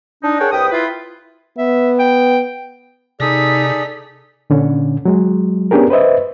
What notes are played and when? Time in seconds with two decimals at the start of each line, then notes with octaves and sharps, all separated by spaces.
0.23 D4 D#4
0.39 G#4 A#4 C#5 F#5 G5 A5
0.51 C2 B4 G5 D#6
0.71 E4 F4 B4
1.58 B3 E5
1.99 G5
3.20 C3 D#4 G#4 A4 D5 B6
4.50 A#2 D3 C#4
5.05 F#3 G#3
5.71 B3 C#4 D4 G4 G#4 A#4
5.90 B4 C5 D#5 E5